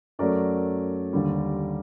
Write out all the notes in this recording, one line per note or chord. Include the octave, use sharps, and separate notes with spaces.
F#2 F#3 A3 A#4 D5
D#2 D3 G3